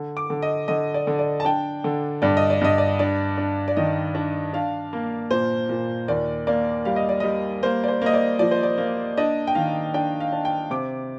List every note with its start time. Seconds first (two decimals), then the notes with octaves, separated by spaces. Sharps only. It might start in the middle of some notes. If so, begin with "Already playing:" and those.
Already playing: D3
0.17 D6
0.30 D3
0.42 D#5
0.68 D3 D#5
0.94 D5
1.07 D3
1.19 D5
1.40 A5
1.45 D4 G5
1.84 D3
2.22 G2 D5
2.37 D#5
2.50 D5
2.61 G2 D#5
2.78 D5
2.99 D4 D5
3.38 D4
3.68 D5
3.77 D#3 D#5
4.15 D4
4.53 D4 F5
4.93 A#3
5.30 A#2 C5
5.69 A#2
6.08 D#2 D5
6.47 A#3 D5
6.85 G3 F5
6.96 D#5
7.09 D5
7.20 G3 D#5
7.63 A#3 C5
7.84 D5
7.88 C5
8.02 A#3 D#5
8.14 D5
8.39 F3 D5
8.51 C5
8.63 D5
8.78 A#3
9.17 D4 D#5
9.47 G5
9.55 D#3 F5
9.94 D4 G5
10.20 F5
10.32 D4
10.45 G5
10.71 C3 D6